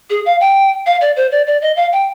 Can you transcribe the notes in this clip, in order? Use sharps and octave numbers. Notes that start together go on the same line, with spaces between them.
G#4
F5
G5
F5
D5
C5
D5
D5
D#5
F5
G5